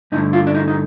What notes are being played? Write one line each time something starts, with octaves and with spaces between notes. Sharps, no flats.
G2 D3 A3 D#4
F4
D4
D#4
D#4